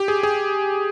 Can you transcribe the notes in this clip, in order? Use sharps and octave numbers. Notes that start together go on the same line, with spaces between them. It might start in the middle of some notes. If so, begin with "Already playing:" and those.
Already playing: G4
G#4
G#4